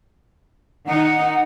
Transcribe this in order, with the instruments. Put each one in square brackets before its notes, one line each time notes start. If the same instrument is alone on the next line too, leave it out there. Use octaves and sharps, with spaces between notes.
[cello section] D#3 D#4 [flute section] F#5